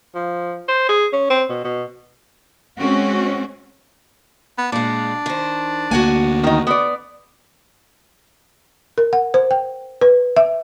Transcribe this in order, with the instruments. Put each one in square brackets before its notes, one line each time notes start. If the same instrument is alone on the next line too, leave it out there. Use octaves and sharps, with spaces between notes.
[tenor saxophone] F3
C5
G#4
C#4
C4
B2
B2
[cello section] G#3 C4 C#4 F#4
[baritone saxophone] B3
[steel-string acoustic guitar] A#2 G#3 [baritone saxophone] D4
[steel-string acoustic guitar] D#3 C5
[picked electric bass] D2 A#3 [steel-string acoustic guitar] F#4 F#5 G#5
[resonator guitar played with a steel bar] D#3 D#4
B3 D5
[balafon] A#4
F#5
C5
G5
B4
E5